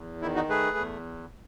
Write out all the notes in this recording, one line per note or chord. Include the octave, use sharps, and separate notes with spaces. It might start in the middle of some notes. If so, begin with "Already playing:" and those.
Already playing: E2
D#3 E4
D#4 F#4
A3 G#4 B4
E2